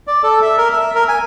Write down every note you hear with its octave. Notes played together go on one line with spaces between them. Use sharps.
D5
A4
E5
A#4
E5
A#4
G#5